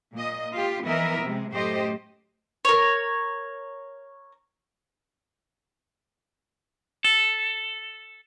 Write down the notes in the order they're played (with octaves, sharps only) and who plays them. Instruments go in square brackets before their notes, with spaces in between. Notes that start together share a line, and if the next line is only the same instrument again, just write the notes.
[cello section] A#2 D#5
F4 G4
E3 F3 B3 A#4 D#5 E5
C3 G#3
F#2 A2 A3 G4 C5 D#5
[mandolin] A#4 C#5
[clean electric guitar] A4